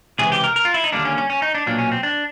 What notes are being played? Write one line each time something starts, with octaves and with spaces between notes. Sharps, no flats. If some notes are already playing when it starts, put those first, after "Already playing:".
C#2 C3 E3 G#4
G4
A#4
A#4
F4
E4
D#4
D#2 D3 G3 A#3 D4
C#4
C#4
C#4
D#4
D4
B1 A#2 F#3 A#3 D4
C#4
C4
D4